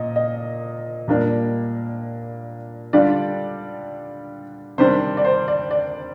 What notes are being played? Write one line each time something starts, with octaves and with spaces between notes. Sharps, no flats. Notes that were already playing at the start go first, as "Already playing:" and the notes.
Already playing: A#2 D#5
D#5
A#2 G3 A#3 D4
D3 G3 D4 F4 D5
C3 D#3 G3 D4 C5
D5
C5
D5
D5